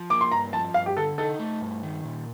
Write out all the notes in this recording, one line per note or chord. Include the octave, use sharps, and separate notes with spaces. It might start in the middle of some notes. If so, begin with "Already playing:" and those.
Already playing: F3
A#3 D6
C6
G2 A#5
F3 A5
G2 F5
G4
D3 A4
D#4 A4
A3
G2
D#3
A#2